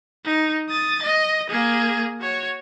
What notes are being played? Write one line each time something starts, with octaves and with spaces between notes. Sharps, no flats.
D#4
D#6 A6
D#5
A#3 G#4
F#4 C#5